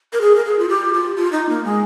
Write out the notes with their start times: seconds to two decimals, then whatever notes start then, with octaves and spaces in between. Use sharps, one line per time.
0.13 A#4
0.21 G#4
0.36 A#4
0.45 G#4
0.59 F4
0.69 G4
0.94 F4
1.16 F4
1.32 D#4
1.49 A#3
1.65 G#3